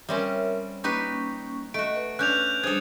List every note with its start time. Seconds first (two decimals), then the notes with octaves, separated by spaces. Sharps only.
0.09 G3 C4 C#4 A#4 C#5 E5
0.84 A#3 C#4 D#4 G4 B4 C#6
1.74 A3 F#4 D#5 D7
1.96 B4
2.19 C#4 D4 F#6 G6 F7
2.63 G3 D4 G#4 A4 C5 D#6 G#6